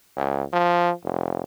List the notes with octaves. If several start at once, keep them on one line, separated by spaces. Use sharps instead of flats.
C#2
F3
F1